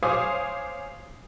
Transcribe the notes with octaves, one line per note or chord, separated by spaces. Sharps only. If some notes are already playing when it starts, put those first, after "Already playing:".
C5 C#5 F5 G#5 D6 D#6